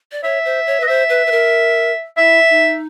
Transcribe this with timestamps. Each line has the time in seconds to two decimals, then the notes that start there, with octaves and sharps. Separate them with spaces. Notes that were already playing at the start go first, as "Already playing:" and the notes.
0.12 D5
0.23 C#5 E5
0.45 C5
0.67 C#5
0.80 B4
0.83 D#5
0.88 C5 E5
1.09 B4
1.27 B4
1.31 A#4
2.17 E4 E5
2.50 D#4